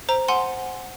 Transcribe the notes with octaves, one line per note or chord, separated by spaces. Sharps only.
C5 A#5
F#5 G#5 C6